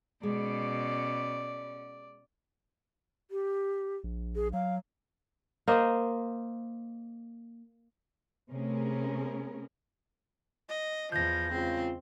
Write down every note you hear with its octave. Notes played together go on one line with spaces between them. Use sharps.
B2 G#3 C#4 D5
G4
A#1
G#4
F#3 F5
A#3 C5 D#5
C3 A3 B3 C#4 G#4 A#4
D#5
E2 F3 G6 A#6
C#3 G#3 C4 F4